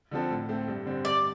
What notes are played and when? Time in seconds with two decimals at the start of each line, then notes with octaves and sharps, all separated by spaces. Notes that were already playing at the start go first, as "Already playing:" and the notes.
0.11 D3 F3 C4 A4
0.30 A2
0.49 A3 C4
0.68 G2
0.86 D3 G3 C4
1.04 G2 D5